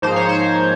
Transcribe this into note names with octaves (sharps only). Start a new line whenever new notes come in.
G#2 F3 A#3 D#4 C5
C#5
C5